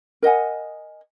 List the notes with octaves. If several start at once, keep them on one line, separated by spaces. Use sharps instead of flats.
A#4 D#5 F#5 G#5